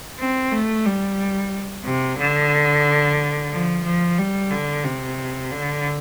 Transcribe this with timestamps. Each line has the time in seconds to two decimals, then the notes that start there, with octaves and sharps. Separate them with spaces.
0.19 C4
0.52 A3
0.85 G3
1.85 C3
2.19 D3
3.52 F3
3.84 F3
4.18 G3
4.51 D3
4.84 C3
5.51 D3